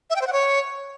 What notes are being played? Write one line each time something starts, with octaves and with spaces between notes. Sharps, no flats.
E5
G5
C5
F#5
C#5